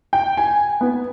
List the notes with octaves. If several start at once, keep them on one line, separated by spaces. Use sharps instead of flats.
G5
G#5
B3